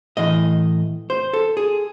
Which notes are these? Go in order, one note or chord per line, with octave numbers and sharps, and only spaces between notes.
A2 E3 D#5
C5
A4
G#4